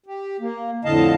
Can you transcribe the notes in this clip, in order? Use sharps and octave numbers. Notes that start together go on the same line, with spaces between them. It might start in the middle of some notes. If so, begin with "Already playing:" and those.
G4
A#3
F2 A2 D3 D#5 F5 A5